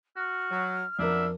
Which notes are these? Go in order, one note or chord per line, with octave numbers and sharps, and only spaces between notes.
F#4 F6
F#3
F2 F#3 B3 D4 A#4 E5